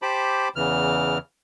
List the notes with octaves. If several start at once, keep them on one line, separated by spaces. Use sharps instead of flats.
G4 C5 A5 B5 D6
E2 C#3 E3 F6